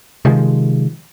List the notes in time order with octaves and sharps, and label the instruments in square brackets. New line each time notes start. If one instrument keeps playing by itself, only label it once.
[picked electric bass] C3 D#3 F3 G#3